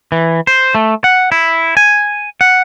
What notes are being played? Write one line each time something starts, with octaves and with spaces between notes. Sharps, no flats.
E3
C5
A3
F#5
E4
G#5
F#5